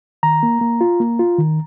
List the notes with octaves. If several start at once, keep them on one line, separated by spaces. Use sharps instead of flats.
D#3 A#5
A#3
A#3
F4
A#3
F4
D#3